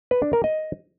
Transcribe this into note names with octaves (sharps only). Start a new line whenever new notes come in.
B4
D4
A#4
D#5